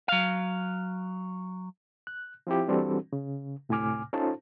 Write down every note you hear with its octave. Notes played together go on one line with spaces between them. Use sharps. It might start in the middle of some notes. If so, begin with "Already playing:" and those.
F#3 F5
F#6
F3 C4 E4 G4
E3 G3 C4 D4 F#4 A4
C#3
D2 A2 C3 G#5 D6 F6
C#4 D#4 F4 A4 C5 A5